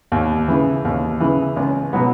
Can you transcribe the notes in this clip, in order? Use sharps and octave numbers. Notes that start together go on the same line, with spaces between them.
D#2
C#3 E3
D#2
C#3 E3
C#2
B2 F#3 B3